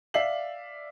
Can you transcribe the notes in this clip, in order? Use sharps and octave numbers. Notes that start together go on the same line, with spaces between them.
D5 E5 F5 C7 F#7